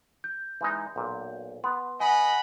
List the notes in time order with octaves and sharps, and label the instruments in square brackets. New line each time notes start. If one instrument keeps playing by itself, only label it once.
[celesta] G6
[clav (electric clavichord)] E3 G#3 D#4
B1 A#2
[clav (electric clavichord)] B3 [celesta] C6
[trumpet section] D#5 F#5 B5 [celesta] G#5